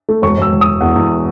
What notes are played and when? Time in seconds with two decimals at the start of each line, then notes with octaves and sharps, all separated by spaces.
0.09 A3
0.22 E1 C#6
0.37 E1 E6
0.52 E1
0.61 D#6
0.66 E1
0.81 E2 F#5
0.96 E2